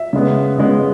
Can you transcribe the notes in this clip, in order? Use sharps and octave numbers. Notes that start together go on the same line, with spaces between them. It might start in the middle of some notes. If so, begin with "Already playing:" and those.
Already playing: E5
C#3 G#3 B3
C#3 G#3 B3